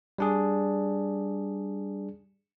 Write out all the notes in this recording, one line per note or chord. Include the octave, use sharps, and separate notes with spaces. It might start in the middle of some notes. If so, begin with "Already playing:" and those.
G3 D4 G#4